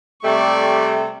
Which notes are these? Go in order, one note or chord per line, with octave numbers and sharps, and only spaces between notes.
C3 G3 A3 D5 C#6